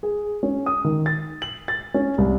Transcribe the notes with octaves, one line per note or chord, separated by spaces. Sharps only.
G#4
C#4
D#6
D#3
A6
F#7
A6
C#4
C2